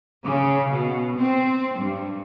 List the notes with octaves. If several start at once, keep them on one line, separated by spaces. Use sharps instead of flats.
C#3
B2
C4
G2